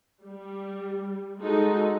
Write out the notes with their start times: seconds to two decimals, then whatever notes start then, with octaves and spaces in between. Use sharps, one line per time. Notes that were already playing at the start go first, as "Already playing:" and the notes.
0.23 G3
1.39 G#3 D#4 F#4 A4